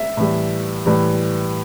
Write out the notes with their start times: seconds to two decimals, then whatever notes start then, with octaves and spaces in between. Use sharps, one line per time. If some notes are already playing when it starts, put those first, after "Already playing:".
Already playing: E5
0.17 A2 E3 G3
0.86 A2 E3 G3